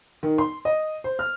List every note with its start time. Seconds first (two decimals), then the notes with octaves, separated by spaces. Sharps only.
0.23 D#3
0.38 C6
0.65 D#5
1.04 C5
1.19 F6